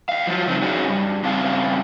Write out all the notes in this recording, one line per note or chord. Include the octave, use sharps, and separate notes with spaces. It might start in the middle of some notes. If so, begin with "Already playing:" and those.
D#5 F5
F3 F#3 F4
G2 C#3 C4 D#4
C#4 D#4 F#4 G#4
G2
G2 C#3 C4 F5 A5